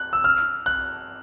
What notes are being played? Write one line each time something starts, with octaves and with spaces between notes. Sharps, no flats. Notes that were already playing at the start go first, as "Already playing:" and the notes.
Already playing: F#6
E6
F6
F#6